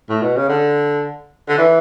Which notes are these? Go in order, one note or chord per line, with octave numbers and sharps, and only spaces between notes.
A2
B2
C#3
D3
D3
E3